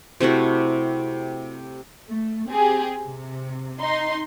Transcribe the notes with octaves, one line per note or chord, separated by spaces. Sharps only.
C3 A3 E4 F#4
A3
C4 G4 G#4
C3
D#4 C6